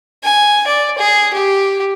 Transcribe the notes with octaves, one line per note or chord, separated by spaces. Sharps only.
G#5
D5
G#4
G4